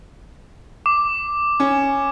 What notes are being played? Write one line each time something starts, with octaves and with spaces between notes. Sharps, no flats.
D6
C#4